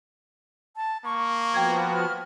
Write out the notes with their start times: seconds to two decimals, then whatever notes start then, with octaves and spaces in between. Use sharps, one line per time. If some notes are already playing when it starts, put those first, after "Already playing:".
0.76 A5
1.05 A#3 C#6
1.54 F3 B3 F#4 G5 G#6
1.92 F6